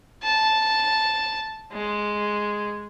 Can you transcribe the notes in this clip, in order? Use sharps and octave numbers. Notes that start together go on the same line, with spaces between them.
A5
G#3